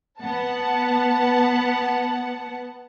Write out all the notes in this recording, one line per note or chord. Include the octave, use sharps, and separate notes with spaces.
B3 F#5 A5